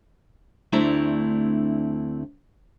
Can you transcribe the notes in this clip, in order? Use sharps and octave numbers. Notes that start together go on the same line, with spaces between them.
D2 A3 C4 D4 E4 A#5